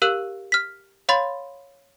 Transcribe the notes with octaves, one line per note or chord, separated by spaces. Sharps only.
G4 A#4 F5 E6 F#6 E7
F6 B6
C#5 F5 B5 C6 A6